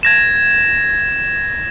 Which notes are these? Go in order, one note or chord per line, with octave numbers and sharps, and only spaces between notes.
G#6 A#6 E7